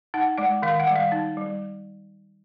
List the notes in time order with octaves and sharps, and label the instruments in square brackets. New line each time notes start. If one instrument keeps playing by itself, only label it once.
[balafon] D#4 F#5
G#3 F#5
D#3 F5
F#5
G3
F5
D#4
G3